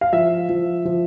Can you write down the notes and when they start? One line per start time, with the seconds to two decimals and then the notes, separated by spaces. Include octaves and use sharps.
0.01 F5
0.13 F3 E5
0.49 F3
0.85 F3